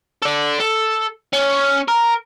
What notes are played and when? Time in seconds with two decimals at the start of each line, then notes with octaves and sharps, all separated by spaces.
0.22 A4 D5
0.60 A4
1.33 C#4
1.88 A#4